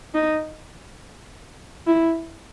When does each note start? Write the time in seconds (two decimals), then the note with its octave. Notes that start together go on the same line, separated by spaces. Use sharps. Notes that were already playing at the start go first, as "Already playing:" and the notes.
0.14 D#4
1.87 E4